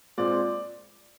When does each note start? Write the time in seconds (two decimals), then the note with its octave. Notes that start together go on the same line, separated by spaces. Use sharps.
0.17 A#2 G#3 C4 D5